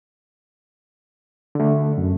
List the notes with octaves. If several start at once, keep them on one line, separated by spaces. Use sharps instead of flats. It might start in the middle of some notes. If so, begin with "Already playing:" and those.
D3 A3
F#2